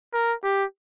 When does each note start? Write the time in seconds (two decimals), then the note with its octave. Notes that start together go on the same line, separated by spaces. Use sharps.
0.13 A#4
0.43 G4